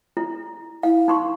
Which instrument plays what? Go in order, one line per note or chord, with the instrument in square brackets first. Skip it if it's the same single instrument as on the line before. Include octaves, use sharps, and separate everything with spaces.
[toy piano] E4
[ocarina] E4 [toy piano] F5
[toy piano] D#4 C6 C#6